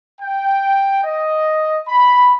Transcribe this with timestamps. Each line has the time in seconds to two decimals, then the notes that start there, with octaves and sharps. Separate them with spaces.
0.20 G5
1.04 D#5
1.88 B5